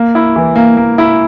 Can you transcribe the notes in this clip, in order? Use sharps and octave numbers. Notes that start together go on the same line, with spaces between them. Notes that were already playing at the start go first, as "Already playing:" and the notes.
Already playing: A#3
E4
E3
A#3
A#3
E4